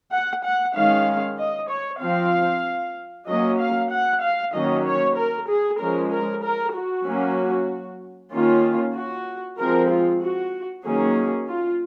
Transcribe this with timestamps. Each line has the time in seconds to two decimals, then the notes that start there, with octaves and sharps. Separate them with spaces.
0.12 F#5
0.45 F#5
0.76 D#3 G#3 C#4 F5
1.38 D#5
1.70 C#5
2.01 F3 C4 F5
3.28 F#3 A#3 C#4 D#5
3.59 F5
3.92 F#5
4.22 F5
4.54 D#3 F#3 A#3 C#4 D#5
4.85 C#5
5.17 A#4
5.49 G#4
5.80 F3 G#3 C#4 A#4
6.12 A#4
6.44 A#4
6.74 F#4
7.06 F#3 A#3 C#4
8.32 D#3 A#3 C#4 F4
8.96 F#4
9.59 F3 G#3 C4 A#4
9.91 F4
10.22 F#4
10.85 D#3 F#3 A#3 C#4 G#4
11.48 F4